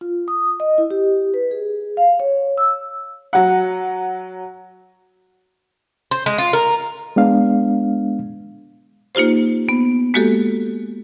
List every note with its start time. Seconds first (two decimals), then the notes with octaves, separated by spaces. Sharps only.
0.01 F4
0.28 D#6
0.60 D#5
0.78 E4
0.91 G4
1.34 B4
1.51 G#4
1.97 F5
2.20 C#5
2.58 E6
3.33 F#3 F#5
6.11 C5
6.26 G#3
6.38 F4
6.53 A#4
7.16 G#3 B3 D4 F5
9.15 A#3 D#4 F4 G4 C5
9.69 B3
10.14 G#3 A#3 F#4 G4 A4